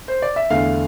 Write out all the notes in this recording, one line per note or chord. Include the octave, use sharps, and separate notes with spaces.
C5
D5
E5
E2 D3 A3 F5